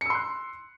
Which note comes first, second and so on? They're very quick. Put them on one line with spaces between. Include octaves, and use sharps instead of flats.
C#7 E6 C6 F#6